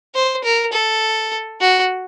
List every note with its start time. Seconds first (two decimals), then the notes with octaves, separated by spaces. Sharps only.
0.15 C5
0.44 A#4
0.72 A4
1.61 F#4